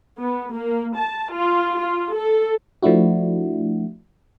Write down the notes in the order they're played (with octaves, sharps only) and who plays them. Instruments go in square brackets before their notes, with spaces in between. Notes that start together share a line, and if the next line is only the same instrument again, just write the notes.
[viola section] B3
A#3
A5
F4
F4
A4
[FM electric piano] F3 A3 D4 E4 F#4